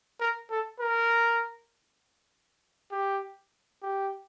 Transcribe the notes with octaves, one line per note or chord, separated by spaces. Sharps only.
A#4
A4
A#4
G4
G4